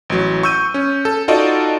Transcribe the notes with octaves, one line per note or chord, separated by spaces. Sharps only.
A1 F#3
C#6 E6 G6 D#7
C#4
A4
D#4 F4 F#4 A4 D5 D#5